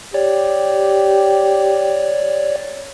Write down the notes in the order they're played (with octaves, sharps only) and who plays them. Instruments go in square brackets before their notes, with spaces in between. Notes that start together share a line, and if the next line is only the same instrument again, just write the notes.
[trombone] G4 [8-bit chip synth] C#5 D5